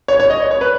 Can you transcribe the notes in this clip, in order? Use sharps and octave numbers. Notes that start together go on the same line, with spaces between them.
C#5
C#5
D#5
C#5
C#5
B4